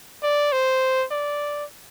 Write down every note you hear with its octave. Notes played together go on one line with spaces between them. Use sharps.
D5
C5
D5